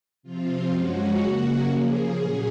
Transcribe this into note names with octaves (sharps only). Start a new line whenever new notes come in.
C3 F3 C4 F4
F#2 F3 G#3 C#4 F#4
C#3 F#3 A#3
C#3 F3 A#3 G#4
A#2 F#3 C#4 G#4